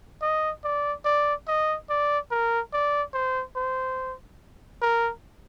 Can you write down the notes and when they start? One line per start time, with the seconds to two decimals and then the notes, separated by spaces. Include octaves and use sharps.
0.22 D#5
0.64 D5
1.05 D5
1.48 D#5
1.90 D5
2.31 A#4
2.73 D5
3.14 C5
3.56 C5
4.82 A#4